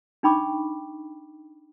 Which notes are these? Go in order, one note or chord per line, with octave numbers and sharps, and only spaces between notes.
D4 D#4 G5 B5 C#6 D6